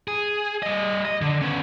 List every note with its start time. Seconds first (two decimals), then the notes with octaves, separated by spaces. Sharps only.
0.08 G#4
0.63 G3 D#5
1.05 D#5
1.21 D3
1.41 B3 C#4